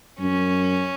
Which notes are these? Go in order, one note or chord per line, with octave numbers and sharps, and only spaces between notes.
F#2 C#4